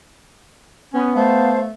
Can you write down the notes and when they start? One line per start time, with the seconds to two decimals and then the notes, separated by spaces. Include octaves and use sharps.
0.94 B3 C#4
1.15 A3 C5 F5 A5